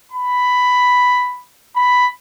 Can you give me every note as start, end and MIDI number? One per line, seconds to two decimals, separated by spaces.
0.12 1.42 83
1.76 2.07 83